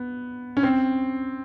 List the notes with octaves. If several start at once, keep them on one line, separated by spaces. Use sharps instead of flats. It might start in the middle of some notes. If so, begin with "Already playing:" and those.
Already playing: B3
C#4
C4